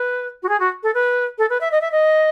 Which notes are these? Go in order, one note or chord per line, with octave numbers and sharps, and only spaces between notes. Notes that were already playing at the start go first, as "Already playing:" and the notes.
Already playing: B4
F#4
G#4
F#4
A4
B4
A4
B4
E5
D#5
E5
D#5